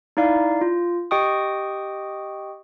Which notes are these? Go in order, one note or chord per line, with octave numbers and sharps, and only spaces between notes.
D#4 E4 D5 F5
F4
G4 D#5 G5 C#6 D#6